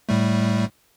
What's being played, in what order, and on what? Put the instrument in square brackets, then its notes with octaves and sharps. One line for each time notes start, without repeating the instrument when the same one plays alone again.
[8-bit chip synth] A2 G3 A3